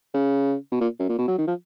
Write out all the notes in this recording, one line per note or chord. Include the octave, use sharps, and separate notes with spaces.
C#3
B2
A#2
F#2
A#2
B2
F#3
D#3
F3